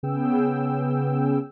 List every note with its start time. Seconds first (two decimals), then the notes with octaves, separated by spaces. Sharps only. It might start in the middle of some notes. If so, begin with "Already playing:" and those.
0.03 C#3 B3 C#4 G#4 G5 E6